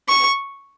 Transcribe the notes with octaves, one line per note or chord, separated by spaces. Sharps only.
C#6